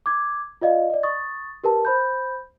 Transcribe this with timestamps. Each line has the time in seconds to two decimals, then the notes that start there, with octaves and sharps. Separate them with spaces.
0.06 D6 G#6
0.61 F4 D5 D#5 F5
0.90 D5 D#5
1.03 C#6 D#6 A6
1.64 G4 A#4 B4 A5
1.85 C5 B5 G6